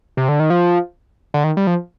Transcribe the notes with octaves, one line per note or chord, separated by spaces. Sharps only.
C3
D3
D#3
F3
D3
D#3
G3
F3